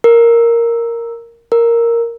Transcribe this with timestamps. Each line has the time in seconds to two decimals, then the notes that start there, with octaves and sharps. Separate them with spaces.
0.04 A#4
1.52 A#4